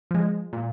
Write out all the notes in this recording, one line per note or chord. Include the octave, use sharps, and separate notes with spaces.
F3 G#3
A#2